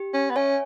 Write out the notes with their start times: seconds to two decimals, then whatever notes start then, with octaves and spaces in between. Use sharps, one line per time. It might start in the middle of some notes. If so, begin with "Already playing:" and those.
Already playing: G4
0.14 C#4
0.30 B3
0.36 C#4 C#5 E5 G#5